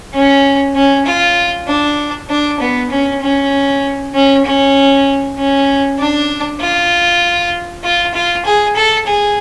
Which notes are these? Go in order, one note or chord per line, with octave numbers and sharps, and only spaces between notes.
C#4
C#4
F4
D4
D4
B3
C#4
C#4
C#4
C#4
C#4
D4
F4
F4
F4
G#4
A4
G#4